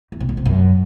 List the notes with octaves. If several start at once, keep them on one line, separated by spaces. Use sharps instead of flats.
E2
C3
C#3
C3
F#2